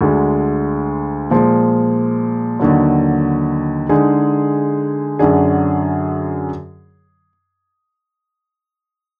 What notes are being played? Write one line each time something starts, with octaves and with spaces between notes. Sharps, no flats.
D2 D3 G#3
A#2 F3 G#3
D#2 D3 F#3
D3 G#3 D#4 G#4
F#2 D3 F#3 D4 G#4